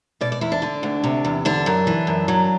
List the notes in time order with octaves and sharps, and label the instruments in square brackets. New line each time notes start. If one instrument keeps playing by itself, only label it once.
[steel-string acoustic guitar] B2 D5
D5
E2 E4
D4
D3
D2
C3
E2
D3 D4
F#2
E3
F#2
F#3